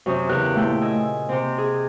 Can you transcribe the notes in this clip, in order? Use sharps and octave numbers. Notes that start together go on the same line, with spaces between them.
F#2 C3 C#4 D#6
E2 C#3 G4 A#4 F#6
A#2 A3 E4 G5
D#5 G#5 E6
C3 C4
G#4